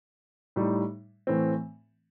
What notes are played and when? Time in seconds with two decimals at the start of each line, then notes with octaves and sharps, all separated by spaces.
0.56 A2 G3 D#4
1.27 A2 E3 A3 C4